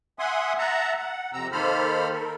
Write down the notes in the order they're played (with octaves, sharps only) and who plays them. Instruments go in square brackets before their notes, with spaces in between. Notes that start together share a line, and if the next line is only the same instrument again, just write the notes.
[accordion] E5 F#5 G#5 C6 D#6
E5 F#5 A5 A#5
F#5
F2 C3 C4 A#5 E6
D#3 A#3 A4 C5 B5 F6
A4 A#4